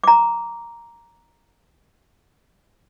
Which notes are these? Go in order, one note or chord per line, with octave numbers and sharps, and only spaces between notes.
A#5 D6